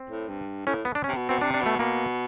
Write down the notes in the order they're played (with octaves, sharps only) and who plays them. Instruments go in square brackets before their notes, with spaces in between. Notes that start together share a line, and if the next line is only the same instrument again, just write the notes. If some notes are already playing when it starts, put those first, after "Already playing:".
Already playing: [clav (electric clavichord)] C4
[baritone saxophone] A2
G2
[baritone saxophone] A2 [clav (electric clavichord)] C#4
[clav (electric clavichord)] B3
D4
C#4
[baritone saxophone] C3
B2
[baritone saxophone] B2 [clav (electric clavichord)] C4
[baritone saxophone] C3 [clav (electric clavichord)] D4
[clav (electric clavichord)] D4
[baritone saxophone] B2
[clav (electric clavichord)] A3
[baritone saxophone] B2 [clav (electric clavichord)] A#3